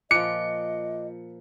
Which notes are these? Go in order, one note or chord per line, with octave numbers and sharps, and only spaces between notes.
A#2 F3 D#5 D6 F#6 C#7 D7